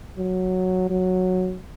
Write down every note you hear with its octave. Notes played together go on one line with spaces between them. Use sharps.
F#3
F#3